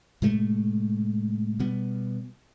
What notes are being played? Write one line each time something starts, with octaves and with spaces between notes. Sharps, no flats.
A2 C3 G#3 A3
B2 G3 B3